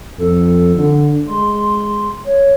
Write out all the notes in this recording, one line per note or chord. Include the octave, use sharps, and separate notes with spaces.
F2 A4
D3
G#3 C6
C#5